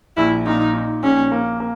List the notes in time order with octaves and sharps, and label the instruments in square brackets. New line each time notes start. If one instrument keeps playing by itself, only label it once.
[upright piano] A#1 [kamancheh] E4
[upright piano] A#2 [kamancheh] D#4
[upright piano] D#4
[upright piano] A#1 [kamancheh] C#4
[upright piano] A#3
A#3